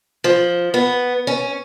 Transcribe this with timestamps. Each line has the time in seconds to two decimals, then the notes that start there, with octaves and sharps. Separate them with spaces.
0.24 F3
0.74 B3
1.27 C#4